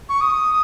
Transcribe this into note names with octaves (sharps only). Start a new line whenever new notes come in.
C#6
D#6